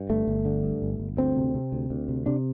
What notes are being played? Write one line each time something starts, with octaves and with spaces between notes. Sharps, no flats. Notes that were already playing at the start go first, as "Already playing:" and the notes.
Already playing: G2
G1 A3
G1
D3
G2
G1
G1
D2 C4
C3
C3
D2
D2
C3
C3 D4